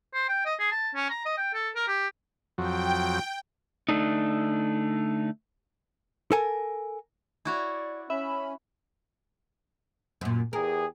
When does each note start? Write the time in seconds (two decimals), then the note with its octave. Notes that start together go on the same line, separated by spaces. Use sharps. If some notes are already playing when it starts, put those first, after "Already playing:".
0.14 C5
0.29 G5
0.46 D#5
0.59 G#4
0.71 A5
0.95 C#4
1.10 A#5
1.25 D#5
1.38 G5
1.54 A4
1.75 A#4
1.88 G4
2.58 F2 F#3 G5
3.89 D3 A3 D4 D#4
6.32 A4 A#4 G#5
7.45 E4 F#4 C#5 D5
8.10 C#4 E5 B5
10.21 F#2 A#2
10.53 E2 G4 G#4 A#4